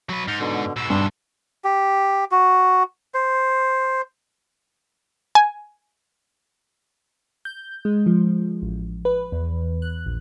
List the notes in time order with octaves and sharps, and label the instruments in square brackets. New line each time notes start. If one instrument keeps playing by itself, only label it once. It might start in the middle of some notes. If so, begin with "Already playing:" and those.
[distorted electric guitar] F#3 B4
[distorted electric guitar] G#2 [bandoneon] F6 G6
[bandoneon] B2 D3
[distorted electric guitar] G#2 B2 [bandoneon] E6
[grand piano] G2 [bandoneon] D4 C6 E6
[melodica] G4
F#4
C5
[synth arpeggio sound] G#5
[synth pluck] G6
G#3
F3
A1
B4
E2
F#6
A#1